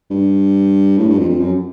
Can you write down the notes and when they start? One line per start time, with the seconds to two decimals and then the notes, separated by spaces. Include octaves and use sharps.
0.11 G2
0.97 A2
1.08 G2
1.18 F2
1.29 F2
1.40 F#2